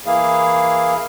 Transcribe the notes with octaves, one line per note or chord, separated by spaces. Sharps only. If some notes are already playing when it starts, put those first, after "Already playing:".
E3 A#3 E4 G#4 F5